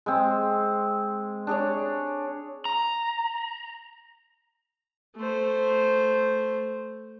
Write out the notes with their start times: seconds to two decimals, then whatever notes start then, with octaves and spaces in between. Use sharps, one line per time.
0.06 G#3 C4
1.47 D4 G#4 C#5
2.65 A#5
5.16 A3 C5